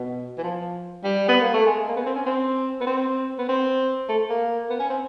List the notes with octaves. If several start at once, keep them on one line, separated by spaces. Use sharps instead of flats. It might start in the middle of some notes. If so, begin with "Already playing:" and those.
Already playing: B2
E3
F3
G3
B3
A#3
A3
G#3
A#3
B3
C4
C#4
C4
B3
C4
B3
C4
A3
A#3
B3
C#4
C4